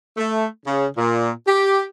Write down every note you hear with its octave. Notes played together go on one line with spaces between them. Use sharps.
A3
C#3
A#2
G4